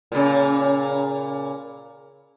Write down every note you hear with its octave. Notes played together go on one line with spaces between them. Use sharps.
A#2 C#3